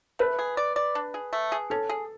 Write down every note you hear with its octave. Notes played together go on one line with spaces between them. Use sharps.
A3 B4
G#4
D5
D5
D4
G#4
A3
G#4
C#4 A4
G#4